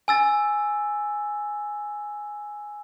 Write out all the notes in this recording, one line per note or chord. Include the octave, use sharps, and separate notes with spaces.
G#5 E6 A6